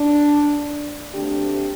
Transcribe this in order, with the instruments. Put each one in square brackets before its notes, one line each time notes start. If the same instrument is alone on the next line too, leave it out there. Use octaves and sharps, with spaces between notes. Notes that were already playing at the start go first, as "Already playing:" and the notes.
Already playing: [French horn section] D4
D2 D3 A3 C4 D4 G4